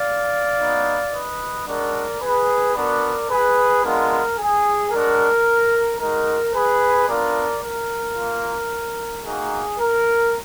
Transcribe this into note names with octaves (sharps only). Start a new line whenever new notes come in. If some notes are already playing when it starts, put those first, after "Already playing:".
Already playing: D5 F5
B3 D#4 F#4
B4 D#5
G#3 D4 F#4 A#4 D5
G#4 B4
B3 D4 F#4 A#4 D5
G#4 B4
G#3 B3 D4 F4 A#4
G#4
G#3 D4 F#4 A#4
G#3 D#4 F#4 A#4
G#4 B4
B3 D4 F4 A#4 D5
A#4
A#3 F4
A#3 D#4 F#4 G#4
A#4